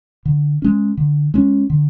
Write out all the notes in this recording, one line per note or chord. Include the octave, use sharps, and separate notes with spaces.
D3
G#3 C#4
D3
G#3 C#4
D3